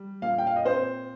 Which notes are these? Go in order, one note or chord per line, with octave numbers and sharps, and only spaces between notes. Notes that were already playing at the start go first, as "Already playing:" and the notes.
Already playing: G3
A#2 F5
G5
F5
D#5
C4 C5